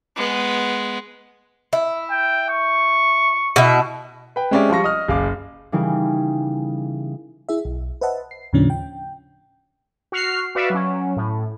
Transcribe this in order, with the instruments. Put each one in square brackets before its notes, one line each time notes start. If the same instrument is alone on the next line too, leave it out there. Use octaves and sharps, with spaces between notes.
[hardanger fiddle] G#3 B3
[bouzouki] E4
[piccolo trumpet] G5
C#6
[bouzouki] B2 E4
[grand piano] B4 G5
G#3 C4 C#4 G4 D5 E5
F3 G3 F4 C#6 A#6
D#5 D#6 F6
F#1 F5 D6
[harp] C#3 E3 G3 D#4 G#4 A#4
[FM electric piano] E4 G#4 E5
B1
B4 C5 D#5 E5 F#5 A5
C7
D#2 A2 C#3 F3 C#4 D4
G5
[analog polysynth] F#4 F6 C7
F#4 B4 D5 E5 F5
F#3 C#4
A2